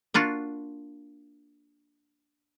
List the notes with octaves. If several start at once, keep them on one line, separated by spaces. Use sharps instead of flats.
A#3 D4 F4 F#4